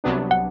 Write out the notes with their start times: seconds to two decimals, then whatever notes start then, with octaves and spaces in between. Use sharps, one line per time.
0.04 C2 C3 F#3 B3 D4
0.31 F#5